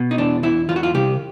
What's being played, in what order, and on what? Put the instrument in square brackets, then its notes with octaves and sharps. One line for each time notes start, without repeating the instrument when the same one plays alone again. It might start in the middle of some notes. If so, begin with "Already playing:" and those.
Already playing: [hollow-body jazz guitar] B2
D#4
E2 D4
E2 E4
E2 F4
F#4
F4
C2 G4